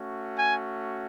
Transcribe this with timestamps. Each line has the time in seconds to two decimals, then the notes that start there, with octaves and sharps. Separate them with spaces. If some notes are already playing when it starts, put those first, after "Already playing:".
Already playing: A3 C#4 F#4
0.37 G#5